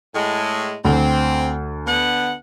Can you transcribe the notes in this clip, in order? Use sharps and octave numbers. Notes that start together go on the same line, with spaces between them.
A2 G#3
D2 C4
D3 B3 F#5